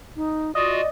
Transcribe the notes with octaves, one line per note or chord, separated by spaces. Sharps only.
D#4
F4 F#4 D5 D#5